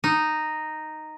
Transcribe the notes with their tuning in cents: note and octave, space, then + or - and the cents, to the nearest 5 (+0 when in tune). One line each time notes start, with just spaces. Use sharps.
D#4 -5